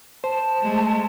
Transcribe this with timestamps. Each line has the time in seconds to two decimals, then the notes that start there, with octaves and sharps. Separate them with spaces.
0.24 C5 A5
0.62 G#3 A3